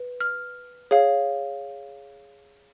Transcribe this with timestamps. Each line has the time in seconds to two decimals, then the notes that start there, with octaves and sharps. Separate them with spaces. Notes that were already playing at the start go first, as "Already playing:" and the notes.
Already playing: B4
0.20 F6
0.91 G#4 C#5 F5